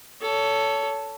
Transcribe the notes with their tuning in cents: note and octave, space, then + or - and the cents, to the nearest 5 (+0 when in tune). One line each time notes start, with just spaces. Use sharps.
A4 +5 C#5 +25